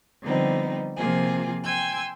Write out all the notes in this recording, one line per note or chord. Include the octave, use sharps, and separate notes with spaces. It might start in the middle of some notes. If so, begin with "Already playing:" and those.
D3 F3 G3 B3 C4 D#4
C3 F3 A#3 F4 G#4
G5 G#5 C6 E6 G#6